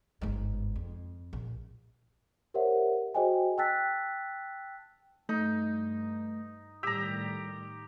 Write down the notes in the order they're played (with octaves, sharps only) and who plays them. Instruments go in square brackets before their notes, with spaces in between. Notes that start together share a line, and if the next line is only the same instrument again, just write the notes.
[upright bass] G1 G#2
F2
A#1
[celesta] G4 A#4 C5 C#5 E5 F#5
F#4 G#4 C5 D#5 G5 G#5
G5 A5 E6 F#6 A6 B6
[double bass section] G2 [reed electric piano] A3 [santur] D#4
[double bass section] A2 D#3 G3 [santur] G4 A#5 [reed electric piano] E6